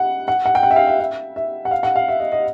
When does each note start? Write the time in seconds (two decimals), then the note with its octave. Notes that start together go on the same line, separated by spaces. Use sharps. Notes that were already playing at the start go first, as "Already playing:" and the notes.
Already playing: F#5
0.28 F#5
0.46 F#5
0.55 G5
0.63 F#5
0.71 E5
0.76 F5
0.87 E5
0.99 E5
1.36 E5
1.65 F#5
1.71 F5
1.83 F#5
1.96 F5
2.08 E5
2.20 D#5
2.32 D#5